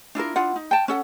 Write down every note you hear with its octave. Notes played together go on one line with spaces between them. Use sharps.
D4 E4 F4 A#4
D4 E4 F4 F#5
D#4
G5 A5
C#4 A4 F#5